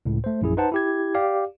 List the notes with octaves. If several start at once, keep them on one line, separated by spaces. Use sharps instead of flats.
C#2 A2
A3 C5
A#1 F#2 E4 G#4
D#4 B4 C5 F#5 A5
E4 G4 G#6
G4 D5 F5